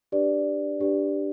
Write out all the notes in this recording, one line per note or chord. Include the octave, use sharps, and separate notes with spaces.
D4 G4 B4 D5
D4 G4 B4 D5